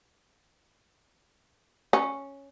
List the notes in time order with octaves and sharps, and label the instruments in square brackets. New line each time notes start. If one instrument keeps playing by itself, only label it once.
[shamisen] C#4